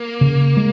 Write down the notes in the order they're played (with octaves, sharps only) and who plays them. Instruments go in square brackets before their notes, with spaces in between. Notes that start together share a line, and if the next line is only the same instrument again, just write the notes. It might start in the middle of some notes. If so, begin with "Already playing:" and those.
Already playing: [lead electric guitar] A#3
[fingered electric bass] C#3
G#3